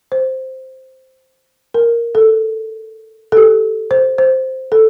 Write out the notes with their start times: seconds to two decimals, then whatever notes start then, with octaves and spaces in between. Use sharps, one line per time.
0.12 C5
1.74 A#4
2.15 A4
3.32 A4
3.37 G4
3.91 C5
4.18 C5
4.72 A4